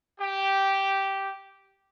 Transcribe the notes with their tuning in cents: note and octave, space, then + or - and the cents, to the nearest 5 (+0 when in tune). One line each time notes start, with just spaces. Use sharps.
G4 -10